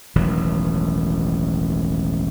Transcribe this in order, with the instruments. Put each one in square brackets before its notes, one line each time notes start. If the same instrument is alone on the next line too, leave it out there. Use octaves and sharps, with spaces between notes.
[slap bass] E1 A1 D#3 F#3